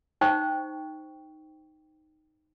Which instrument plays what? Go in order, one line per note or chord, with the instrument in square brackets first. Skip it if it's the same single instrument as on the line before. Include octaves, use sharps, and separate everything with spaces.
[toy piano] D#4 C5 G5 C#6